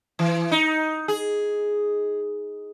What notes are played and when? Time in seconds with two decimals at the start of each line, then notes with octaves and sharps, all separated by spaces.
0.19 E3
0.51 D#4
1.08 G#4